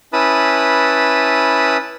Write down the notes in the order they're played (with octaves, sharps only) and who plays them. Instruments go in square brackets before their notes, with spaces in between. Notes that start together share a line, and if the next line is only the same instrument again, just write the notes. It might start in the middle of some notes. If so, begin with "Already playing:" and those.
[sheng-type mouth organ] C#4 E4 B4 A5 B5 D#6